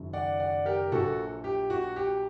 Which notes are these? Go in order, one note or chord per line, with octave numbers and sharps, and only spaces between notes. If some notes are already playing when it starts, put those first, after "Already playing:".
Already playing: F#1 F#2 D#3 F#3
D5 F#5
D5 F#5
G4 A#4
A#1 A#2 F#3 F#4 A4
G4
F#4
G4